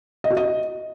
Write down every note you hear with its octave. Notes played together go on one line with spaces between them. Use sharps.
D#5
F#4
D#5